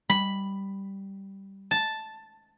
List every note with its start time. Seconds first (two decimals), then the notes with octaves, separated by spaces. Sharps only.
0.10 G3 B5
1.71 A5